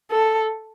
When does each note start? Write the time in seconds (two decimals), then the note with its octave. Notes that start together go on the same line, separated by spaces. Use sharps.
0.11 A4